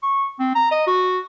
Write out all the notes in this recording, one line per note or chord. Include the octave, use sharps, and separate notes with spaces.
C#6
C4
A#5
D#5
F#4